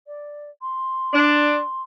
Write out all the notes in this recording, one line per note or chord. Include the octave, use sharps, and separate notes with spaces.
D5
C6
D4